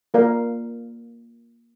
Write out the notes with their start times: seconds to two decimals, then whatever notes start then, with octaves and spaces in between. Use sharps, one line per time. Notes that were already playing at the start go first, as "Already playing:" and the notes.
0.14 A#3 F4 A#4 D5 F5